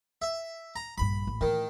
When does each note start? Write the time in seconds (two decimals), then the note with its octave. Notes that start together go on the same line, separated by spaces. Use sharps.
0.22 E5
0.76 A#5
0.98 A#1 G2 B5
1.27 A1
1.41 A2 D#3 E3